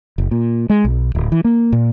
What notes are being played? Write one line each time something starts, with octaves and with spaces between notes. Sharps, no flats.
F#1
A#2
G#3
B1
D1
E3
A#3
A#2